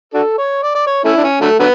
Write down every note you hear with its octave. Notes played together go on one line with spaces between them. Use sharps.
D4 F#4 A4
C#5
D5
D5
C#5
A3 C#4 E4
D4
C#4
D3 F#3 A3
D3 F#3 B3